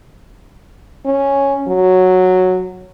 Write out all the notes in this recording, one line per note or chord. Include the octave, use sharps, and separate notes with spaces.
C#4
F#3